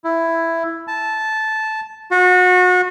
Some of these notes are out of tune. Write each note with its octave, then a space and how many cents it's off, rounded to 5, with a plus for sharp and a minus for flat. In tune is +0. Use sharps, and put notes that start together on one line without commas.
E4 +5
A5 -10
F#4 -30